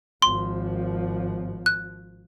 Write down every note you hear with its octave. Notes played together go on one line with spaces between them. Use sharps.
G#1 F3 C6
F#6